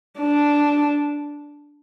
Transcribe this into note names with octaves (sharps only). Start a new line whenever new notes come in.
D4